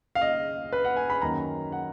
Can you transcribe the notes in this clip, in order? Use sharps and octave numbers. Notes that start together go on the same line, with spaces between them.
F5
D#5
B4
F#5
G#5
B5
F#2 D#3 A#3 C#4 A#5
F#5